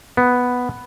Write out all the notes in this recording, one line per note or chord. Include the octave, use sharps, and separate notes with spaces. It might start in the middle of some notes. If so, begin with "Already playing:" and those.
B3